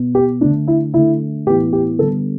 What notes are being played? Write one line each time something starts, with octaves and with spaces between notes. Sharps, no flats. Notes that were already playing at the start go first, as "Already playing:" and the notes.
Already playing: B2 B3
G4
D3 A3 D4
E4
D3 A3 E4
A2 E3 B3 G4
G4
D3 G3 B3 A4